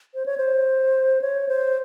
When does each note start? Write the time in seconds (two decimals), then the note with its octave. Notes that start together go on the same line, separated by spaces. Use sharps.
0.14 C5
0.26 C#5
0.38 C5
1.21 C#5
1.48 C5